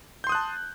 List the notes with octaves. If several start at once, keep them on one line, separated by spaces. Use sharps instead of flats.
A5 C6 D#6 F#6 G6